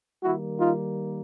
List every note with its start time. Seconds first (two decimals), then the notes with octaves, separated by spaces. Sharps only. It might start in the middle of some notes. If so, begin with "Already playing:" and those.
0.23 D#3 G3 A#3 E4 F#4
0.59 D#4 F4